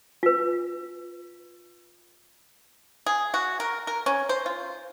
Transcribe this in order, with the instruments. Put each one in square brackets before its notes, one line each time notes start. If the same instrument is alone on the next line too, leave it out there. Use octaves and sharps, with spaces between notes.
[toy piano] F4 B4
[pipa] G#4
F#4
A#4
A#4
C#4
C5
F4